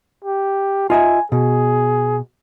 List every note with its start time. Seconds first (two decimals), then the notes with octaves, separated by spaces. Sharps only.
0.25 G4
0.90 F4 D#5 E5 G#5
1.32 B2 G#4